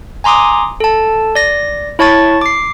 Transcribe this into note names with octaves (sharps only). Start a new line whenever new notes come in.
G#5 A#5 C6 D6 D#6
A4 A5
D5 A#6
E4 C#5 A5 C#6 A6
D6 C7